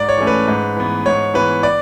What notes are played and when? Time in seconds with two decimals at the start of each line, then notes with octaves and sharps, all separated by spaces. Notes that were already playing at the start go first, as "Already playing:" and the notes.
Already playing: G#2 D5
0.09 C#5
0.17 E3 A3 C#4
0.27 B4
0.47 G#2
0.77 E3 B3
1.05 G#2 C#5
1.34 E3 B3 B4
1.63 D5